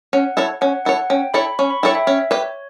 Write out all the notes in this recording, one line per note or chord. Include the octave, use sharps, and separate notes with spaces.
C#4 F#5
E4 A4 C#5
C#4 F#5
E4 A4 C#5 F#5
C#4 G5
E4 A4 C#5 B5
C#4 C#6
B5
E4 A4 C#5 G5
E5
C#4 E5
G4 B4 C#5